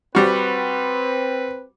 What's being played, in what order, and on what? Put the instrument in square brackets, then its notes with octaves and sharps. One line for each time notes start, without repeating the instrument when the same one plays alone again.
[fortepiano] G3 F#4 [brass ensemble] C4 B4